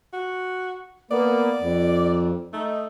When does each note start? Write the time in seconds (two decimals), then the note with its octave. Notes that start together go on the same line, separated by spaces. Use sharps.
0.13 F#4
1.11 A#3 B3 D5
1.61 F2
2.53 A3 D#4